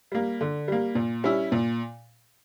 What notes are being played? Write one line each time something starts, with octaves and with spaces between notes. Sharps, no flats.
G3 A#3
D3
G3 A#3
A#2
G3 C#4 E4
A#2